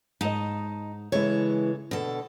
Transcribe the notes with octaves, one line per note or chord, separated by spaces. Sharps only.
G#2 D#4 D#5 A5
C#3 E3 G#3 E4 A4 C#5
B2 D3 A4